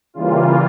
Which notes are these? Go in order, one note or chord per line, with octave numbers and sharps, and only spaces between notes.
C#3 E3 G3 A#3 F4